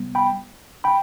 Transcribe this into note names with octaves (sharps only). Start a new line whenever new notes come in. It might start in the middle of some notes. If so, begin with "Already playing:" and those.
Already playing: C3 G3 B3
G5 B5
G5 B5